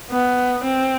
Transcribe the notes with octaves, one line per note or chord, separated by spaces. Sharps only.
B3
C4